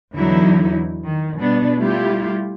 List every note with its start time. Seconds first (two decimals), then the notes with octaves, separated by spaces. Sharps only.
0.13 E2 D3 E3 F#3 D#4 E4
1.06 D#3
1.38 B2 G3 B3 D4
1.78 G3 A3 E4 F4 G4